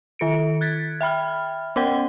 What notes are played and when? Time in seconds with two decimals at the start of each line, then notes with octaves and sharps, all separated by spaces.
0.19 D#3 A4 C#7 D7
0.61 F#6 G#6 A6 B6
1.01 E5 G5 B5 F6
1.76 B3 C#4 A#4 F#5 G5